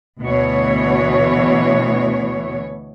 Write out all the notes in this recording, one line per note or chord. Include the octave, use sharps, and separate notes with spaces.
D2 B2 E3 C#5